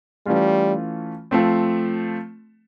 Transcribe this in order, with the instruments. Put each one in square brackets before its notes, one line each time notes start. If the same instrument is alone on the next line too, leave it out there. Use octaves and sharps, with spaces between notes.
[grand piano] E3 A3 C#4 F4 [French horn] G3
[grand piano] F3 A3 C4